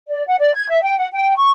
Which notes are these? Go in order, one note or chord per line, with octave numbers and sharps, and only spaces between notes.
D5
F#5
D5
G#6
E5
G5
F#5
G5
C#6